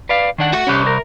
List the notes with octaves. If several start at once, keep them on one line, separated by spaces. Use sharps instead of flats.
B4 D5 F5
D#3 D4 F#5
A3 F#4 F#5
C2 C#4 G4
A#4